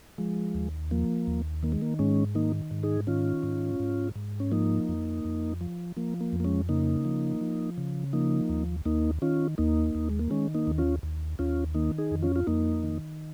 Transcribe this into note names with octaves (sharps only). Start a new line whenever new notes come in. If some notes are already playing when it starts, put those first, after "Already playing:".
F3 G#3
D#2
F3 A#3
D#2
D#3 A#3
G#3
A#3
G#2 G#3 C#4
D#3 A#3 D#4
G#2
D#4 G#4
D#3 C#4 F4
G#2
G#2
G#2
C#4
F3 A#3 D#4
F2
F2
F3
F3 A#3
A#3
F2
A#3
G#3 C#4
C#3 A#3 D#4
F3
F3
C#3
F3 A#3 D#4
D#2
D#2 A#3 D#4
D#3 C#4 F4
D#2 A#3 D#4
D#2
G#3
A#3
D#3 G#3 C#4
A#3 D#4
D#2
C#4 F4
D#2
D#2 C#4 F4
D#3 A#3 D#4
D#4 G#4
F2
C#4 F4
F4
F2 A#3 D#4
D#3